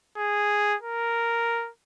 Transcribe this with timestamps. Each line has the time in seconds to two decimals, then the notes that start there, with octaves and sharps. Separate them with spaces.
0.17 G#4
0.83 A#4